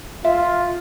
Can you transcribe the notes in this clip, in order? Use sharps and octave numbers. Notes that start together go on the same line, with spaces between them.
F4 E5